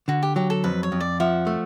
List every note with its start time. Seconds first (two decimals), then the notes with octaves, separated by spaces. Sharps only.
0.08 D3 F#4
0.23 G4
0.36 F#3 G4
0.50 A4
0.64 F2 B4
0.83 C#5
0.92 F2
1.00 D5
1.20 F3 E5 F#5
1.47 A3